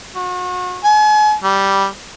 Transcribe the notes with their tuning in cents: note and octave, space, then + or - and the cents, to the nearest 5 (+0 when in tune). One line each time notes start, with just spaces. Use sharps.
F#4 -35
G#5 +40
G3 -5